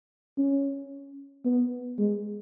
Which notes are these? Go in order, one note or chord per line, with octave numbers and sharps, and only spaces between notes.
C#4
B3
G#3